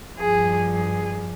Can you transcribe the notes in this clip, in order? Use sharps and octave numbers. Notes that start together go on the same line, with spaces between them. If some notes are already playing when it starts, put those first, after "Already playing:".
G2 F3 G#4
G#4